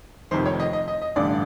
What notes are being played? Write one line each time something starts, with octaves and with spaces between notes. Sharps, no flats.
F1 F2 C3 D#3 C5
C#5
D#5
D#5
D#5
D#5
A1 G2 D3 D5